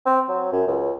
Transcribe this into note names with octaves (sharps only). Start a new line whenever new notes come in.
C4
F#3
F#2
C#2